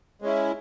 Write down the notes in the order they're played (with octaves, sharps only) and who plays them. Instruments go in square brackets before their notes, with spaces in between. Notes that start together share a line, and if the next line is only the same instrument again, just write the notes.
[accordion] G#3 C#4 E4